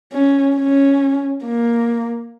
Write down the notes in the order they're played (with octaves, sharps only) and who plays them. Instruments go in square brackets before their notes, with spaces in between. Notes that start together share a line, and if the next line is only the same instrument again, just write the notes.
[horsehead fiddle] C#4
C#4
A#3